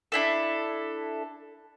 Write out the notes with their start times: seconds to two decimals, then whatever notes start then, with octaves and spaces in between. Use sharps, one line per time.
0.12 D4 E4 A4